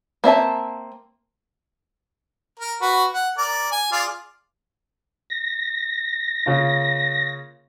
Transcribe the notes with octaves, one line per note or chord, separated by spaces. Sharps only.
A#3 C4 E5 A5
A#4
F#4 B4
F#5
A#4 D5
G#5
F4 G#4 D5
A#6
C#3 A#3 F4